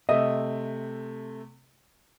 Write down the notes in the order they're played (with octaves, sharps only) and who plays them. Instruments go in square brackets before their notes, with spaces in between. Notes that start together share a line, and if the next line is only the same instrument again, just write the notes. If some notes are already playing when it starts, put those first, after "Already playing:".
[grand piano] C3 A3 [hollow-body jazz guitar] D#5 E5